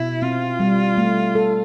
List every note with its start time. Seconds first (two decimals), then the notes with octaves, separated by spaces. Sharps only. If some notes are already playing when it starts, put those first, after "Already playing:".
Already playing: B2 E4
0.22 C4 F4
0.60 G3
0.98 A3
1.35 A4